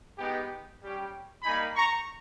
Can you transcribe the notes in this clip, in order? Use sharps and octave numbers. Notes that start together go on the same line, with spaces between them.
G#3 B3 D#4 G4
G3 C#4 G4
G3 A#3 D#4 G#5 B5
A#5 C#6